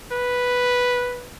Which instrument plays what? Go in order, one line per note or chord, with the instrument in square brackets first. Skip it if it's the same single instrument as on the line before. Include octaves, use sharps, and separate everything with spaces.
[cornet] B4